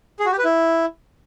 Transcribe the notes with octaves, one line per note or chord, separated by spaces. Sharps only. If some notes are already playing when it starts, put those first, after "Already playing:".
G#4
F#4
G4
B4
E4